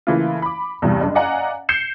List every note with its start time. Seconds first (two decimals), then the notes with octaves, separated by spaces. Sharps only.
0.07 C#3 E3 A3 A#3 E4 F4
0.42 B5 D6
0.82 E2 G2 C3
1.00 F#1 D4
1.15 D5 D#5 F5 F#5 G#5 A#5
1.69 G6 C7 C#7 E7